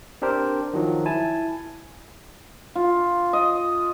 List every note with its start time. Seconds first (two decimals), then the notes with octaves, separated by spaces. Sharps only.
0.22 C4 D4 G4 A#4 C5
0.73 D#3 F3 F#3
1.06 E4 G#5 A5
2.75 F4
3.33 D#5